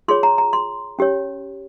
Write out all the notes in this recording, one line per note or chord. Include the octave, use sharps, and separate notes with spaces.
F4 G#4 C#5 C6
A#5
A#5
C6
C#4 G4 C#5